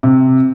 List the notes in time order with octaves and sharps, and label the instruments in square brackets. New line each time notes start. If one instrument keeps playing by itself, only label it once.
[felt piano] C3